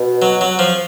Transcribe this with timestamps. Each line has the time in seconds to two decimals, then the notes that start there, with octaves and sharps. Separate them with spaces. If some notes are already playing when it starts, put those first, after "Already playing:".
Already playing: B2
0.22 F#3
0.41 F#3
0.59 F3